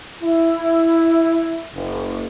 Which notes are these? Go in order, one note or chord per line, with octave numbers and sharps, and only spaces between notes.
E4
F#1